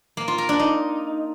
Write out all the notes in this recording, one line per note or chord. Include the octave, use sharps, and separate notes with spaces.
A#3
F4
A#4
D4
D#4